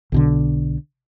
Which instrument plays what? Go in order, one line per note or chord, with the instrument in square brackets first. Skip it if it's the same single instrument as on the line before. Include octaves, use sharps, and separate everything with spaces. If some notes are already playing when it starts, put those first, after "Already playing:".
[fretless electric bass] B1 B2 D3